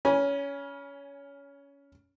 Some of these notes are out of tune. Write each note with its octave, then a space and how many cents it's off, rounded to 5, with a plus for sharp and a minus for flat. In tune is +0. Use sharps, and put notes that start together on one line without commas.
C#4 +20 G#5 +0 B5 -35